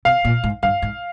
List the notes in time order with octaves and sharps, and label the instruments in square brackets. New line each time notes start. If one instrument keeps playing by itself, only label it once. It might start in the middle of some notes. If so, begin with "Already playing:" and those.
[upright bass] C3 [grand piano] F5
[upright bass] A#2
G#2
[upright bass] G2 [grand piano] F5
[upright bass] G#2